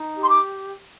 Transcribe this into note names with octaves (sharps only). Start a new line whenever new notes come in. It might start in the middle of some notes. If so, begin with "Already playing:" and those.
Already playing: D#4
G4
C6
D6